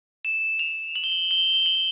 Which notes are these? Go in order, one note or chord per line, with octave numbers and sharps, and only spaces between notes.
E7
F7
F#7
G7
F#7
G7
G7
F#7